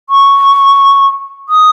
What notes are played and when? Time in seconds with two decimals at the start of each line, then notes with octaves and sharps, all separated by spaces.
0.10 C#6
1.49 D#6